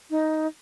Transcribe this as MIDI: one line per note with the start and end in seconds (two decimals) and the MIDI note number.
0.10 0.47 63